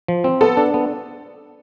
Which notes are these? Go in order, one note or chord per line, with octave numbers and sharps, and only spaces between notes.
F3
C4
B3 A4
D4
B3